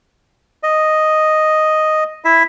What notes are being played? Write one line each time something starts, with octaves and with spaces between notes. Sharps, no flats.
D#5
E4 E5